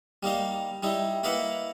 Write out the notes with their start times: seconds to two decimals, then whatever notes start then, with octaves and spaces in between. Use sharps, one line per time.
0.23 G3 A#3 D#4 F5
0.83 G3 D#4 E4
1.23 A#3 E4 B4 D#5 F5 F#5